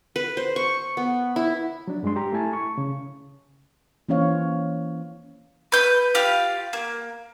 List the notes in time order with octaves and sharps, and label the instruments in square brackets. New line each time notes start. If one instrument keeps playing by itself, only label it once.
[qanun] B4
C5
C#6
B3
E4
[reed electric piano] F#3 D4
G2 G#3 D4 C6
G4 A#5
A3 E4 G#5 A5
C#6
C#3
[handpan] E3 A#3 C#4 C5 C#5 F5
[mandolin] B4 G6
F4 G4 F5
A#3